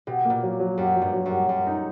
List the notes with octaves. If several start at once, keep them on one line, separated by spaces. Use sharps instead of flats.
B2 G4
A#2 A#3
F#3
F#3
F#2 G4
F#3
G2
F#3
F#2
G4
F#2 G4
D#4